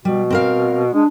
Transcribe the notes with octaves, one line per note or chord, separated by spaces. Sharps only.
B2 G3
C4 A#4 F5
G#3 D4